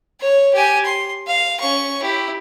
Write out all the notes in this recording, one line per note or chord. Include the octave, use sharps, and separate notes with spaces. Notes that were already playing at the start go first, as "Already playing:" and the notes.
C#5
G4 G#5
C6
F5
C#4 C#6
E4 G4